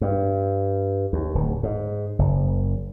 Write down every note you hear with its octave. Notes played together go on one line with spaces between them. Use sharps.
G2
D#2
D1
G#2
F#1